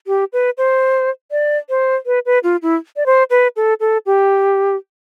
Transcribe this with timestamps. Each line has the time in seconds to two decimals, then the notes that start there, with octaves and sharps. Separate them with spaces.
0.07 G4
0.33 B4
0.58 C5
1.31 D5
1.69 C5
2.06 B4
2.26 B4
2.43 F4
2.62 E4
2.96 D5
3.06 C5
3.30 B4
3.56 A4
3.80 A4
4.06 G4